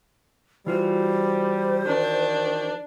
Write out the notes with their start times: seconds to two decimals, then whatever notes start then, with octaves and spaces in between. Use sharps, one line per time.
0.66 E3 G3 F4 F#4 C5
1.86 D#3 D4